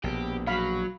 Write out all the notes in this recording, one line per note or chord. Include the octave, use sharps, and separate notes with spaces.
A#1 B2 B3 G4
F#3 F#4 F5 B5